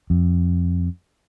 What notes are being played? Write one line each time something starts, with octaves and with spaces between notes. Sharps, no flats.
F2